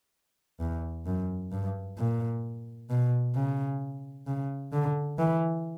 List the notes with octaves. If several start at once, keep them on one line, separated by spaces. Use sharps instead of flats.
E2
F#2
G2
A#2
B2
C#3
C#3
D3
E3